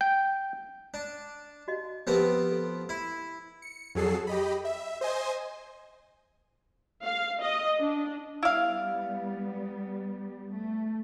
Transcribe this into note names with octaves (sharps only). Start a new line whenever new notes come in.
G5
D4
F#4 D#5
F3 B3 C4 G4 A#4
A4
E4
C#7
F2 F#3 G#4 A4 C7
G4 D#5 B5
E5
C5 D#5 G#5 C6
F5
D#5
D4
G3 B3 E4 F5
A3